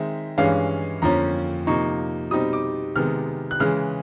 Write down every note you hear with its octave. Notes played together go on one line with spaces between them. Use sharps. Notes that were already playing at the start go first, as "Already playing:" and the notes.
Already playing: D#3 G#3 C4 E5
G2 E3 G#3 C#4 F5
F2 D3 F3 A#3 C#4 A#5
C3 F3 A#3 D#4 C#6
B2 G3 C4 D#4 D#6
D6
C3 D#3 G#3 B3 F6
F#6
C#3 E3 G#3 F6